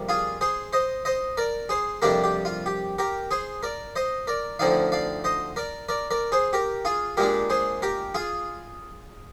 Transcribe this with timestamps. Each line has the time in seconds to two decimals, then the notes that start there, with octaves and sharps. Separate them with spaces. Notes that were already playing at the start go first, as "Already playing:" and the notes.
Already playing: F2 C3 G3 A#3
0.09 F4 G#4
0.41 G#4 C5
0.73 C5 D#5
1.05 C5 D#5
1.37 A#4 D5
1.69 G#4 C5
2.02 F2 C3 G3 A#3 D4 G4 A#4
2.24 G4
2.45 F4
2.66 G4
2.98 G4 A#4
3.31 G#4 C5
3.63 A#4 D5
3.96 C5 D#5
4.27 A#4 D5
4.59 D2 D3 F3 C4 D#4 D5 F5
4.92 D5 F5
5.24 C5 D#5
5.56 A#4 D5
5.89 A#4 D5
6.11 A#4 D5
6.32 G#4 C5
6.53 G4 A#4
6.85 F4 G#4
7.17 A#2 G#3 D4 G4 A#4
7.50 G#4 C5
7.82 G4 A#4
8.15 F4 G#4